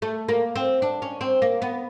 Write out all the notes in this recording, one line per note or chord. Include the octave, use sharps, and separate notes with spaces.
A3
A#3
C4
D4
C#4
C4
A#3
B3